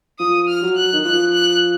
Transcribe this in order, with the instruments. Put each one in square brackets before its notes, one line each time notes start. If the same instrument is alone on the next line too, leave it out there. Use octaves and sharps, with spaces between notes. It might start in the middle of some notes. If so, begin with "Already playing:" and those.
[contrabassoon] F3 [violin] D#6
[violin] F6
[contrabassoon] F#3
[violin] F#6
[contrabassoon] D#3
[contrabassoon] F3 [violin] F#6
[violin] F#6